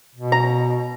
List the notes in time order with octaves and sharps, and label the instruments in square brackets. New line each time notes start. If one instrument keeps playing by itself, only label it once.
[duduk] B2
[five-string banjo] A#5